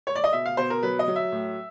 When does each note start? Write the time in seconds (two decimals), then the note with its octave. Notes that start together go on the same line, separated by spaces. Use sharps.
0.07 C#5
0.15 D5
0.24 D#5
0.33 B2 E5
0.46 F5
0.57 B2 C5
0.70 A#4
0.83 F#3 B4
0.99 D#5
1.08 F#3
1.16 E5
1.32 A2